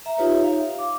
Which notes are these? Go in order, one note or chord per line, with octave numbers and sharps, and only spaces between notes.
E5 A#5
D#4 F4 G4 B4 C#5 E5
F5
D6